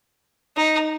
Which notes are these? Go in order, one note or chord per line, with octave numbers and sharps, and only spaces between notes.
D#4